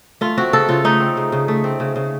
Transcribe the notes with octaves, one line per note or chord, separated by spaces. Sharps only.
A3 F4
C4 F#4
C#3 A4
C#3 F4
A3 D#4
C4
C#3
C#3
A3
C4
C#3
C#3